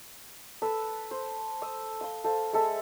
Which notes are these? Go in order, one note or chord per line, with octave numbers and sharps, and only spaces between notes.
A4 B4 E6
C5
D#6 E6
F5 C6
A4 C5 F5
G#3 A4 E5